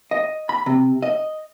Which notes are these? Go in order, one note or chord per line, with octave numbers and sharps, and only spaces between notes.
D#5
B5
C3
D#5